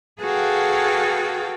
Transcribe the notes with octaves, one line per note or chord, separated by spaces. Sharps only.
F#4 G#4 A4 B4 F5 G5